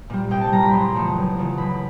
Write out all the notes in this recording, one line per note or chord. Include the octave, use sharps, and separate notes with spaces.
A#2 G3
C2 G5
A5
A#2 G3 A#5
B5
F#1 C6
E2 C#3 F3 A3
F#1
E2 C#3 F3 A3
F#1 B5